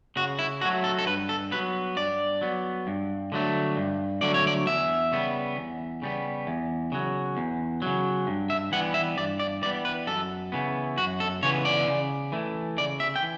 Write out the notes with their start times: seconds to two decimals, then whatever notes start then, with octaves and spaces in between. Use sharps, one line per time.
0.16 C#3 F#4
0.39 E4
0.61 A3 F#4
0.65 F#3
0.84 A4
0.99 A4
1.06 G2 B4
1.29 A4
1.51 F#3 B3 B4
1.96 G2 D5
2.41 F#3 B3
2.87 G2
3.32 D3 F#3 A3
3.77 G2
4.21 D3 F#3 A3 D5
4.34 C#5
4.47 D5
4.66 E2 E5
5.12 C#3 G3 B3
5.57 E2
6.02 C#3 G3 B3
6.47 E2
6.92 C#3 F#3
7.37 E2
7.82 C#3 F#3
8.27 G2
8.50 E5
8.72 E3 G3 B3 F#5
8.94 E5
9.17 G2 D5
9.39 D5
9.62 E3 G3 B3 D5
9.85 B4
10.07 F#2 A4
10.52 C#3 E3 B3
10.97 F#2 F#4
11.20 A4
11.43 C#3 E3 B3 C#5
11.65 D5
11.87 C#3
12.32 E3 A3
12.77 C#3 D5
13.00 E5
13.16 G5
13.22 E3